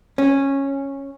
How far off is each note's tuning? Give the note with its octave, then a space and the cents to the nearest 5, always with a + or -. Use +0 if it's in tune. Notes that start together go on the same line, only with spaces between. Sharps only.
C#4 -10